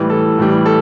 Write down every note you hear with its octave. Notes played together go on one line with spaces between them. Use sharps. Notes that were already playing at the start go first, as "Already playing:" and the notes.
Already playing: A2 E3 G3
A4
A2 E3 G3
A4